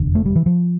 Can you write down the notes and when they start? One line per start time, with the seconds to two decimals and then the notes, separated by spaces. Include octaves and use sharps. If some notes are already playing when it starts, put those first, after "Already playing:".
Already playing: F1 E2 D3
0.15 A3
0.26 G3
0.36 E3
0.46 F3